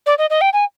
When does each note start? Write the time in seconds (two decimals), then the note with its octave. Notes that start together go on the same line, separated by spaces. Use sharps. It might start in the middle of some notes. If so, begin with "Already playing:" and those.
0.06 D5
0.18 D#5
0.30 D#5
0.41 G5
0.53 G#5